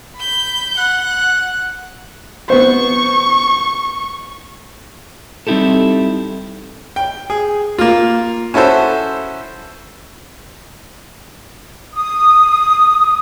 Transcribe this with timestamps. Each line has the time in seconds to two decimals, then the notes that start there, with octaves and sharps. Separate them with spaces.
0.16 B5 G6
0.78 F#5 F#6
2.50 B3 C5 C#6
5.47 G3 C4 D#4 E4 G4 A4
6.96 G5
7.30 G#4
7.78 A#3 F4
8.54 C#4 E4 F#4 A4 C5
11.94 D#6